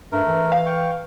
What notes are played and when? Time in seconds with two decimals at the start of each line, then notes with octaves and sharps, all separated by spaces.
0.12 G2 A3 A#4
0.28 E3
0.52 F5
0.66 G5 C#6